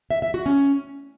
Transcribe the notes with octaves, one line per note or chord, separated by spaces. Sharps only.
E5
E5
F#4
C#4